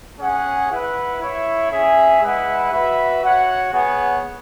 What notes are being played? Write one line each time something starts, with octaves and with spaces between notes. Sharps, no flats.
C#4 G#4 C#5 F#5
E4 B4 F#5
E4 C#5 E5
C#4 G#4 E5
G#3 E4 B4 F#5
F#4 B4 E5
F#4 C#5 F#5
B3 G#4 C#5 F#5